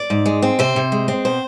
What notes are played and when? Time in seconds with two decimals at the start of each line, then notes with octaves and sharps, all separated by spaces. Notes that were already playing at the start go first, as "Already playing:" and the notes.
Already playing: D5
0.10 G#2
0.26 G#3
0.42 C4
0.59 C3 C5
0.76 C3
0.92 G#3
1.08 C4
1.25 B2 C5